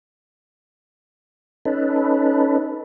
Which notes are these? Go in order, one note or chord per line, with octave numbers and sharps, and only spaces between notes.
C#4 D#4 A4 B4